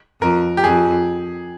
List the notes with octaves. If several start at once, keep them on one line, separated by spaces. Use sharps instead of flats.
F2 A#4
G4
F2 G#4